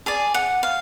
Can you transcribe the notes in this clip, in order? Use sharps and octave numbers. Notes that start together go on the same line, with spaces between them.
G#4 D5 G#5
F#5
F5